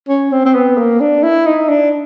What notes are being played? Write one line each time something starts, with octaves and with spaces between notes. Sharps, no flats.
C#4
C4
C4
B3
A#3
D4
E4
D#4
D4